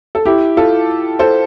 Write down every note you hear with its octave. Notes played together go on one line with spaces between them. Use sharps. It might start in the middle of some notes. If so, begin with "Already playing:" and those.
A4
E4 G4
F4 A4
A4 C5